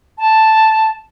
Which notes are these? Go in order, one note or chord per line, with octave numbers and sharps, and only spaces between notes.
A5